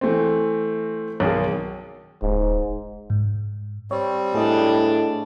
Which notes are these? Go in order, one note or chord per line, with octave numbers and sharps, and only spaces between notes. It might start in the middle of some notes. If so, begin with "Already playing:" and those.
E3 A3 C4
B1 D#3 G#4
D#1 G#2
G#2
G3 C4 C#5
A2 D4 G#4 D#5